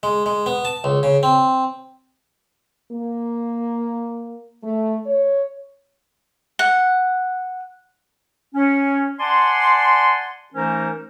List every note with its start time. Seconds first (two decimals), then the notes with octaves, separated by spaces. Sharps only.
0.03 G#3
0.26 G#3
0.46 B3
0.65 A5
0.84 C#2
1.03 C#3
1.23 C4
2.91 A#3
4.63 A3
5.06 C#5
6.59 F#5
8.55 C#4
9.20 D5 F#5 G#5 A5 C6
10.54 E3 A3 C#4 D#4 A#4 C5